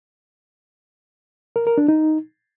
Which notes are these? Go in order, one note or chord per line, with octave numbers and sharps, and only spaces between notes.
A#4
A#4
D4
D#4